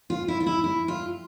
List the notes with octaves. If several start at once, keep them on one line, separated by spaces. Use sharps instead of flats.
F4
E4
F4
E4
E4
F4